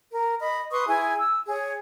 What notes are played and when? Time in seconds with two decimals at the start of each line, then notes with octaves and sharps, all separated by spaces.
0.11 A#4
0.39 D#5 B5
0.71 B4 C6 C#6 D#6
0.88 E4 G#4 G#5
1.17 E6
1.46 G#4 C#5